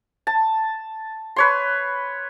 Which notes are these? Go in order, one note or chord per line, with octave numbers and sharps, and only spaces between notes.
A5
B4 C#5 C6